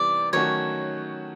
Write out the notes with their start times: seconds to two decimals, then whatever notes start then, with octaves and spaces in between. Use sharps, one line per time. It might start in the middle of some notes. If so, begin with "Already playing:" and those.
Already playing: C3 E3 G3 B3 D5
0.33 D#3 F#3 A3 C#4 F#4 C#5